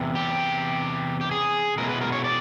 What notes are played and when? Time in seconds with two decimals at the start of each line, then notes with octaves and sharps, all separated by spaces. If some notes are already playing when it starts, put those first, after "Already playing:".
Already playing: E2 C3
0.15 G4
1.21 G4
1.31 G#4
1.78 B2 G#3 C#4 E4 A#4
1.89 B4
2.01 A#4
2.12 C#5
2.24 D5